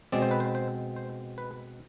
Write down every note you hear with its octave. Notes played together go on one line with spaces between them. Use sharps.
B2 G#3 C4 D5
C5
B4
C5
C5
C5
B4